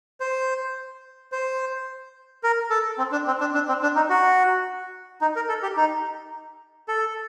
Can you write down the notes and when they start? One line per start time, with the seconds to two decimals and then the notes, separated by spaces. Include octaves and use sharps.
0.20 C5
1.32 C5
2.43 A#4
2.70 A4
2.98 C4
3.12 D4
3.27 C4
3.41 D4
3.55 D4
3.68 C4
3.83 D4
3.96 D#4
4.10 F#4
5.21 D#4
5.36 A#4
5.49 A4
5.63 G4
5.77 D#4
6.88 A4